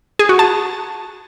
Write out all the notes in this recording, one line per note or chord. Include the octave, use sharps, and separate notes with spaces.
G#4
F#4
A5